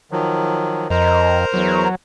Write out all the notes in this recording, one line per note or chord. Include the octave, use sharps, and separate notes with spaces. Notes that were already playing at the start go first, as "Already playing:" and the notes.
D#3 F3 F#3
F2 A#4 C5 D#5 A#5
E2 F#3